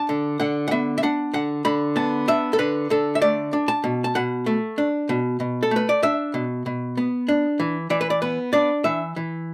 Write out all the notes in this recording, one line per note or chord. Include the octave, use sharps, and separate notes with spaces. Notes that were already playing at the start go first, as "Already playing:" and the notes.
Already playing: D4 A5
D3
D3 F#5
F#5
B3 E5
E5
D4 F#5
D3 F#5
D3 B5
B3 A5
D4 E5
A4
D3 B4
D3 A4
E5
A3 D5
D4
A5
B2
A5
B2 F#5
A3
D4
B2
B2
A4
A3 B4
D5
D4 E5
B2
B2
B3
D4
E3
E3 D5
B4
D5
B3 B4
D4 D5
E3 E5
E3